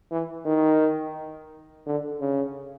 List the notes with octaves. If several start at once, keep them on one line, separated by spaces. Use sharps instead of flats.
E3
D#3
D3
C#3